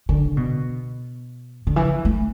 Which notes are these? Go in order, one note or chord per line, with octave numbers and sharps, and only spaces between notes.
D3
B2
D3
E3
A3